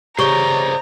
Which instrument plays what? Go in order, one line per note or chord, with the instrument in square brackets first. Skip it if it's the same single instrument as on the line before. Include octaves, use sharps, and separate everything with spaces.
[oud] C#3 [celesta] G4 C#6 G7 [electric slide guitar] C5 D5 D#5 [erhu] A#5